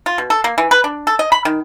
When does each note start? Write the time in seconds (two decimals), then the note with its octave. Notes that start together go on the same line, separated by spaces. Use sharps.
0.06 F4
0.18 B2
0.30 A4
0.44 A#3
0.58 E3
0.71 B4
0.84 D4
1.07 A4
1.19 D#5
1.32 B5
1.45 D#3